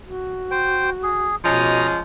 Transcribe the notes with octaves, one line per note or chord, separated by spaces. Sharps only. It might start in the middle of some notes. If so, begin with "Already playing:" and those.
F#4
C5 G5
G#4
B2 F3 G#3 C#4 A#5 D#6